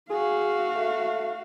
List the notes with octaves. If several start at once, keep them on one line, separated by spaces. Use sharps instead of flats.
F#4 G#4 F5
A3